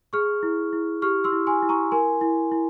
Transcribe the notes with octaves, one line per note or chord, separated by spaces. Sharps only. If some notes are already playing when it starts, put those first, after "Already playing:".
G#4 C#6 F6
E4
E4
G4 C#6 F6
C6 E6
E4
G#5 C6
E4
A#5 C#6
A#4 G#5 C6
E4
E4